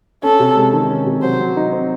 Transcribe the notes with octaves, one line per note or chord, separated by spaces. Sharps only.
C#4 A4
C3
G#3
D#3
C#4
C3
F#3 C5
F#3
D#4
C4